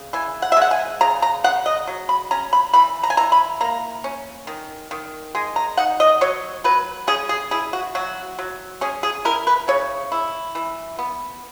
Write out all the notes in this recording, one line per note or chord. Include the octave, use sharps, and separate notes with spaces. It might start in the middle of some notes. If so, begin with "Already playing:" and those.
Already playing: C#3
E3 G#5
F#5
E5
G#3 F#5
G#5
C#3 A#5
A#5
C#3 F#5
D#5
F#3
B5
C#4 A#5
B5
E3 B5
A#5
G#5
E3 A#5
B5
A#3 A#5
C#4
D#3
D#3
G#3 G#5
A#5
D#4 F#5
D#5
F#3 C#5
F#3 B4
C#4 G#4
G#4
E4 G#4
F#4
F#3 F#4
F#3
C#4 G#4
G#4
E4 A#4
B4
C#3 C#5
E4
E3
B3